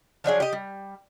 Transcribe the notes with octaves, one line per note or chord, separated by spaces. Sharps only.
F3 F#3 D4 G#4
G4 D#5
G3